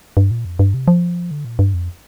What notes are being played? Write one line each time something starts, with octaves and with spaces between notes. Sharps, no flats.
G2
A#2
F2
G2
C3
F3
D3
A#2
G2
F2